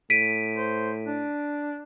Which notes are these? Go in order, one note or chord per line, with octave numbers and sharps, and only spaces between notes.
A2 B6 D7 D#7
C5
D4